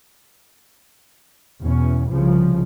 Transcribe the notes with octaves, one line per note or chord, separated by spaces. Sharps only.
E2 B2 C#4
C2 C#3 F3